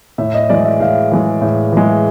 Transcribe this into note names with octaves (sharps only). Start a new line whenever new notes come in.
A2 E5
D#5
E3 G#3 D5
E5
A2 F5
E3 G#3
A2
E3 G#3